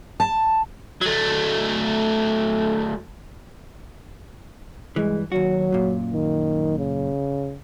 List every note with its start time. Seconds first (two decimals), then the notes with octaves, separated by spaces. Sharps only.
0.20 A5
1.01 F#3 A3
4.96 G2 E3 G#3
5.32 D#2 F#3 F#4
5.72 F#2 A#2
6.13 D#3
6.78 C#3